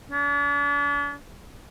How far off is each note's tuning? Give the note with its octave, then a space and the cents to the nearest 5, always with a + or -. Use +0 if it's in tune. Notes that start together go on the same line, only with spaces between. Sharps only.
D4 -45